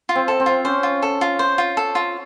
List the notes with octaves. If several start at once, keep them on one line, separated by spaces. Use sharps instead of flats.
F4
C4
A4
C4
F4
C#4 C5
F4
A4
F4
C5
F4
A4
F4